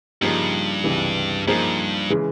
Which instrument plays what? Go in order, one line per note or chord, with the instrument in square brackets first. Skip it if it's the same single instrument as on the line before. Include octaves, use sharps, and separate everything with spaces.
[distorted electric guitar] G2 [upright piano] C#3 F3 A#3 D#4 G4
[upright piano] C#2 C3 E3
[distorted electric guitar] G2 [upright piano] F3 A#3 D#4 G#4 C5
[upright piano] C#3 E3 G#3